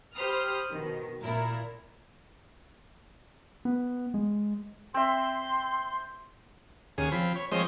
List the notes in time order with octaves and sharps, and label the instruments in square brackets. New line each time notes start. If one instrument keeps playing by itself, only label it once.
[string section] G4 C5 B5 D#6 F6
B2 D#3
A#2 E4 A#4
[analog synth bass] B3
G#3
[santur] C4 E5 [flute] C6
[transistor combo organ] D#2 C#4 G#4
F3 C4 B5
C#5
F3 G#3 C4 C5 C#5 D#5